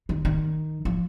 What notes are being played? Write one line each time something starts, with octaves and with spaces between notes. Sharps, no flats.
D#3
D#3
F3